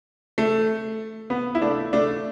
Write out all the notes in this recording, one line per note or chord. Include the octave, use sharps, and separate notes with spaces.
A3
B3
E4
A3 D4
A3 D4